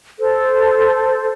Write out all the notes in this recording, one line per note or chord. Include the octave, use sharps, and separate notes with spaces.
A4 C5